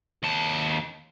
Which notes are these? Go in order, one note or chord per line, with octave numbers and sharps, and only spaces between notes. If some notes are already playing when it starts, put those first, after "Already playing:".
D#2 A5